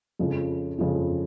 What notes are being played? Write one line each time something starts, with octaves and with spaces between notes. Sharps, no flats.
F2 C#3 F3
F2 C#3 F3